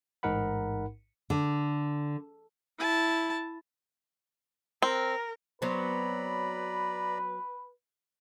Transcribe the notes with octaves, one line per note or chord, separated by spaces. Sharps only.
A1 G#2 D#4 A#4 F#5 B5
D3
E4 A5
C4 A#4
F#3 B3 C4 B4 D5 A#5 B5